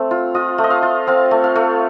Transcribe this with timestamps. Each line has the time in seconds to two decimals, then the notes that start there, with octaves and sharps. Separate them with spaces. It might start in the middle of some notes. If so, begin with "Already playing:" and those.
Already playing: A3 C4
0.11 F4
0.35 F4 D#5
0.58 A3
0.64 D#5
0.70 F5
0.83 F4
1.07 C4 F5
1.31 A3
1.44 F5
1.56 A3